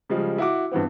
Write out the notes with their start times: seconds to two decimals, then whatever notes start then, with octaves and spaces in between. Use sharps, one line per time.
0.09 C#3 F3 G3 G#3
0.38 E4 F#4 D6
0.71 G2 E3 B3 C4